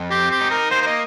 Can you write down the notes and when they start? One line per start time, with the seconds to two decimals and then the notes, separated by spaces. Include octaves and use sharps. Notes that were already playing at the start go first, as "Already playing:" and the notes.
Already playing: F2
0.11 C4 G4
0.31 G4
0.41 D#4
0.51 A#4
0.71 A#3 C5
0.82 C5
0.86 D#5